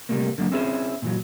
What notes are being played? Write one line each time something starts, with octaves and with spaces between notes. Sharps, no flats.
C3 G3 A3 A#3
D3 F#3 A#3
C4 C#4 E4 G#4 A4 C5
A#2 E3 F#3